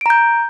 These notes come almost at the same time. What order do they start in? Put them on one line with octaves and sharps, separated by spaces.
D7 A#5 G6